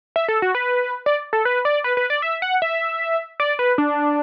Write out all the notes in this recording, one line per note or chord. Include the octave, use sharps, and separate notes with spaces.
E5
A4
F#4
B4
D5
A4
B4
D5
B4
B4
D5
E5
F#5
E5
D5
B4
D4